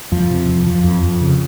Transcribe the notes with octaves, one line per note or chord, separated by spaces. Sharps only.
F2 F3
C3
F2
F2 F3
F2
F2
C#3